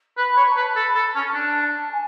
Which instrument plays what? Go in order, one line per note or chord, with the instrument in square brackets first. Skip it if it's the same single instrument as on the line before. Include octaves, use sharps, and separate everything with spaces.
[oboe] B4 [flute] B5
[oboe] C#5
[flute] B5
A5
[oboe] B4
[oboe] A4 [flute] B5
[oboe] A4 [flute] A5
[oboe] C#4 [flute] A5
[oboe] D4 [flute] A5
[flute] A5
G#5